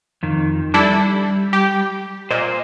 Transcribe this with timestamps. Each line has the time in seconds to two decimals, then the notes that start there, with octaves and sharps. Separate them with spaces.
0.23 F2 D#3
0.74 G3 D4 E4 A4
1.53 G4
2.31 A#2 C5 D#5